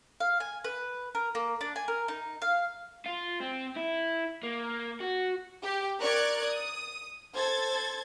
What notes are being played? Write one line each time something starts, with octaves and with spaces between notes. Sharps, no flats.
F5
G#5
B4
A#4
A#3
D4
G#5
A#4
D#4
F5
F4
C4
E4
A#3
F#4
G4
A#4 D5 C#6 F#6 G#6
D#6
A4 C5 G#6 A6